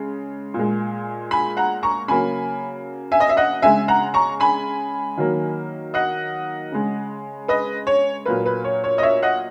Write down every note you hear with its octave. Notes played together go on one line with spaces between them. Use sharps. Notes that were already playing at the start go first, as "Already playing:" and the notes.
Already playing: C#3 G#3
A#2
G#3
G#5 B5
F#5 A#5
A#5 C#6
C#3 F#3 A#3 G#5 B5
E5 G#5
D#5
E5
D#5 F#5
C#3 G#3 E5 G#5
F#5 A#5
A#5 C#6
G#5 B5
D#3 F#3 A#3
D#5 F#5
C#3 G#3
B4 D#5
C#5
A#2 F#3 A#3 B4
B4
C#5
C#5
D#5
C#5 E5
D#5 F#5